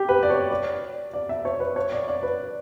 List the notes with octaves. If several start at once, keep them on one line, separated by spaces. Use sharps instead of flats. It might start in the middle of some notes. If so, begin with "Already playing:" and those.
Already playing: G4
B4
D5
C#5
D5
D5
E5
C#5
B4
C#5
D5
D5
B4